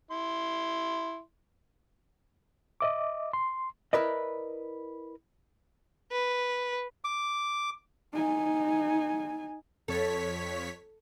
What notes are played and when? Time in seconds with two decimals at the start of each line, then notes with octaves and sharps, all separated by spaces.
0.11 E4 C6
2.81 D#5 E5 D6
3.33 C6
3.93 E4 A#4 B4 D5 D#5
6.12 B4
7.04 D6
8.13 D#4 G#5
9.88 F2 A4 C#5 B6